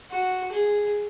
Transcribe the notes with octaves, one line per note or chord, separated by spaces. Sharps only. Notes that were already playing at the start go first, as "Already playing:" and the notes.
F#4
G#4